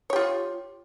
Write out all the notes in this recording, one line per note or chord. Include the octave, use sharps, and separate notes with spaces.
F4 G4 C#5